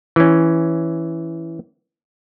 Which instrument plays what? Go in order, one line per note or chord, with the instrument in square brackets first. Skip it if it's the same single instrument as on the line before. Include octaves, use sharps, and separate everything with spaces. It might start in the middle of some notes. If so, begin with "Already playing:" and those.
[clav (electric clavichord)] E3 C#4